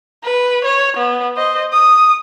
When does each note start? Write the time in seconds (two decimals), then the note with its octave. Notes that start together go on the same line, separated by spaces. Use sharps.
0.24 B4
0.65 C#5
0.97 B3
1.37 C5 D#5
1.72 D#6